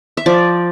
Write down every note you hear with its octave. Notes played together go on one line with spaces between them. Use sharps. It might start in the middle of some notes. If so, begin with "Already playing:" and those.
E5
F3 D5